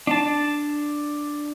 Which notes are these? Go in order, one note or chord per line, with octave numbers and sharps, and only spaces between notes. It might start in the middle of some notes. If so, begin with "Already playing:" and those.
D4 A5